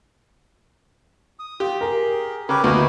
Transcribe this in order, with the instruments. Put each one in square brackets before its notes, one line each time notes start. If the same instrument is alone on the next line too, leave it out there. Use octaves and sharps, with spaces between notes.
[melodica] D#6
[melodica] F4 [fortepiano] G4
[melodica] G#4 [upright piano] A#4
[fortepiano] C#3 [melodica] G4 A#4 B4
[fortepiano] D2 A#3 [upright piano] B3 [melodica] A#4 D#5